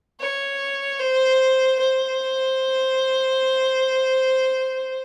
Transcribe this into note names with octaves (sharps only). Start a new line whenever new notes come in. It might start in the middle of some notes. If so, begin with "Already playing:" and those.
C#5
C5
C5